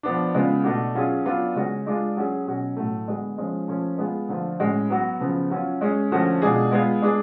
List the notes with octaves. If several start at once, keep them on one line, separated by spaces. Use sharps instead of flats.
F3 B3 D4
C#3 G#3 B3 F4
B2 A3 D4 F#4
F#3 C#4 F4 G#4
F#3 B3 D4 F4
C#3 G#3 C#4 F#4
G#3 D4 F4 G#4
F#3 C#4 G#4
B2 F#3 C#4 F#4
A2 F#3 A3
D3 G#3 B3 F#4
F3 G#3 C#4 F4
F3 A3 C#4
G#3 B3 F4 G#4
D3 F3 A3 F4
A2 G#3 C#4 F#4
F#3 B3 F#4
C#3 F3 B3
F#3 C#4 F4
G#3 C#4 G#4
D3 F3 A3 C#4 F#4
B2 G#3 D4 F4 G#4
G#3 B3 F4 G#4
G#3 D4 G#4